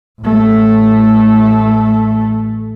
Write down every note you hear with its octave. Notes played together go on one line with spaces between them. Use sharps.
A1 A3